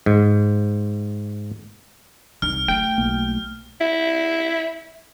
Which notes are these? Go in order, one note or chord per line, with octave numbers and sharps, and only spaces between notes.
G#2
C2 D#4 F6
A3 F4 G5
B1 A#3
E4